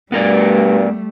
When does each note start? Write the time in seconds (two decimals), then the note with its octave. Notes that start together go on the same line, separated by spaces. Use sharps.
0.12 G2 G3 A3 B3 A#4 D5